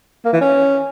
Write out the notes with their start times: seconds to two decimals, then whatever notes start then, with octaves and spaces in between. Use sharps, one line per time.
0.25 A#3
0.33 E3
0.41 C#4